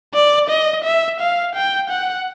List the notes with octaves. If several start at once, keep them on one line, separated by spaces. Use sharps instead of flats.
D5
D#5
E5
F5
G5
F#5